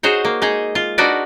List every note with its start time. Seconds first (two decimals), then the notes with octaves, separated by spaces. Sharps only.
0.03 D#4 F#4 G#4 C5 C#5
0.25 A#3
0.42 G#3 D#4 G#4
0.75 F4
0.98 D4 D#4 F#4 A#4 B4 D5